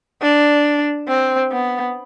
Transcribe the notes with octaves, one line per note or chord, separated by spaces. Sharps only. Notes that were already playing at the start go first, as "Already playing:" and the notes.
D4
C4
B3